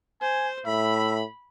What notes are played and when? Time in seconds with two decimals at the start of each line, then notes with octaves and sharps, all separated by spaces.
0.22 C5 G#5
0.66 A2 E5 B5